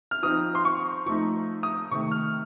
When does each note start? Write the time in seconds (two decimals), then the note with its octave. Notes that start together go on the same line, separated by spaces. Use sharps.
0.11 F6
0.23 F3 C4 D#4 D#6
0.55 C6
0.65 C#6
1.06 F3 A3 D#4 C#6
1.63 D#6
1.91 C3 D#3 A3 C#6
2.11 F6